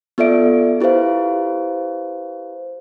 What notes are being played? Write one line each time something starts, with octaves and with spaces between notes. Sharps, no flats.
B3 F4 A4 D5 E5 D7
E4 G4 B4 C5 F5